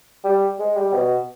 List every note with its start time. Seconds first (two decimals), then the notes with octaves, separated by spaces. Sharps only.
0.24 G3
0.59 G#3
0.76 G3
0.94 B2